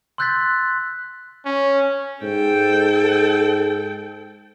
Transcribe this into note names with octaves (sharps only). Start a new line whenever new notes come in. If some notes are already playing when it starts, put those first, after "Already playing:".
C6 E6 F#6 G6 A6 B6
C#4
G#2 A4 G5